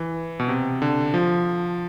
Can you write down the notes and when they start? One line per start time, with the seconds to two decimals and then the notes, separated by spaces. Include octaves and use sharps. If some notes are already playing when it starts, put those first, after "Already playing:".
Already playing: E3
0.40 B2
0.48 C3
0.82 D3
1.14 F3